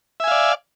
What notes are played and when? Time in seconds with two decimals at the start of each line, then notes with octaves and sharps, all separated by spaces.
0.20 E5
0.24 G#5
0.28 F5
0.31 D5